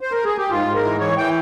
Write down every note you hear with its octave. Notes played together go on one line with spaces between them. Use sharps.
C5
A#4
G#4
G4
G#2 F4
G#2
A#4
E3
E3 C#5
E3 G5